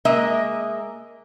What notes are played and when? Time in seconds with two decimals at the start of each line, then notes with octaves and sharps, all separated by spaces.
0.05 G#3 A#3 A#4 D#5 E5